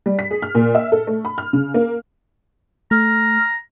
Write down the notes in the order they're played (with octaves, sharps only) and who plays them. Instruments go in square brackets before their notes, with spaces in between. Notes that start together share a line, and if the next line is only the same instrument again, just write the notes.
[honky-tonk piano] G3
B6
G#4
F6
A#2
E5
A4
A3
B5
F6
C#3
A#3
[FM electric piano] A3 [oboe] A#5 [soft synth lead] F6